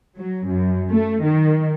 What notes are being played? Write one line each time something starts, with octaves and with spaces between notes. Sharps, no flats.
F#3
F#2
A3
D#3